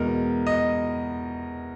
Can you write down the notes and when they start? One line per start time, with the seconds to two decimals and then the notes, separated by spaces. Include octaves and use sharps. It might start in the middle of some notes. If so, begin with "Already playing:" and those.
Already playing: E2 B2 G#3 A#4
0.47 D#5